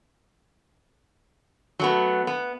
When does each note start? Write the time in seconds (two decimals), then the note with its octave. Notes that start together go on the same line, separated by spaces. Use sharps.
1.79 F#3 A3 B3
2.27 B3